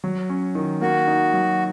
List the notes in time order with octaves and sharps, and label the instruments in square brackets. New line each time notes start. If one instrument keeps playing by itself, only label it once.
[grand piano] F#3
C#4
D#3
[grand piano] A#3 [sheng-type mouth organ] F#4
[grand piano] D#4
F#3